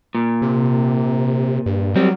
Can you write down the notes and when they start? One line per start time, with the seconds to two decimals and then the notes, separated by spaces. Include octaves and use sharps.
0.15 A#2
0.42 C3
1.66 G2
1.96 F#3 G3 C4